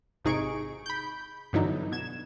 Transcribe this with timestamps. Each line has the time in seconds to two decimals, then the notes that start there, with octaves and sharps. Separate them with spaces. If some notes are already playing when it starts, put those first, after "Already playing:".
0.25 G#1 C3 D#4 G#4 C#6 D7
0.86 B5 G6
1.53 G2 B2 D3 E3 F#3 D#4
1.92 B2 G#6 E7